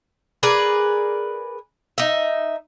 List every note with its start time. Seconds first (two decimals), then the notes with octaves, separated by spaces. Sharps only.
0.43 G#4 A#4 B4 D5
1.98 D#4 E5